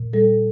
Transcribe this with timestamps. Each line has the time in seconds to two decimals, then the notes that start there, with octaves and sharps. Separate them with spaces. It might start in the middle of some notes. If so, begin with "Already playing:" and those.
Already playing: A#2
0.13 G3 A4